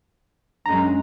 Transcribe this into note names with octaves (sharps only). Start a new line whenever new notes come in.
F#2 F#3 G#3 C#4 D4 A#5